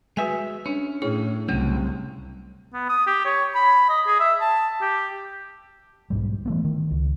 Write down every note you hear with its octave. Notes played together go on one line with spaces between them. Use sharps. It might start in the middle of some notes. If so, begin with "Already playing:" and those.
G#3 F#4 B4 E5 G#5
C#4 D4
A2 E4 G#4 C#5
C2 F#2 C#3 A3 C#4
B3
D#6
G4
C#5
B5
D#5
G#4
E5
A5
G4
B1 G#2 G3
E3 A3 B3
D#3
C#2